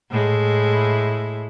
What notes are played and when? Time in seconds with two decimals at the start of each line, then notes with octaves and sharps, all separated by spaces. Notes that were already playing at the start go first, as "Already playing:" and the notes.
0.11 A2 G#3 E4